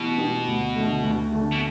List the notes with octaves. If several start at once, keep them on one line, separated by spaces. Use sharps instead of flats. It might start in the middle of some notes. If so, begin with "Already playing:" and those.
Already playing: B2 E3 B3 G4
B3 G4
D2
D3 A3
D2
D3 A3
B2